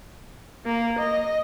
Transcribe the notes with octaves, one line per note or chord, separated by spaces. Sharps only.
A#3
D#5